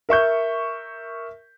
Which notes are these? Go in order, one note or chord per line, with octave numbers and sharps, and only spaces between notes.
A#4 E5 C#6 G6